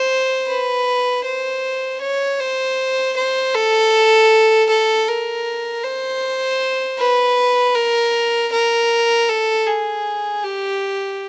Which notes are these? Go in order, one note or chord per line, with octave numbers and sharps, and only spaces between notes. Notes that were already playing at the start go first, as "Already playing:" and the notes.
Already playing: C5
B4
C5
C#5
C5
C5
A4
A4
A#4
C5
B4
A#4
A#4
A4
G#4
G4